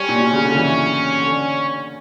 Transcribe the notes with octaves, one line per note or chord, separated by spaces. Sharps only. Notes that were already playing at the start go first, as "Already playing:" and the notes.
Already playing: G3 C#4
A#2
B2
C#3
D3
E3
D3